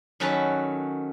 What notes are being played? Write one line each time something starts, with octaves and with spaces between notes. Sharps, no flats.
D#3 F#3 C#4 F#4 A4 B4